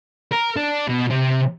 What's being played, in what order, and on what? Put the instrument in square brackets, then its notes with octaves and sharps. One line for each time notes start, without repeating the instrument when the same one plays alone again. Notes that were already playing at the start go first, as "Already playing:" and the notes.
[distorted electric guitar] A#4
D4
B2
C3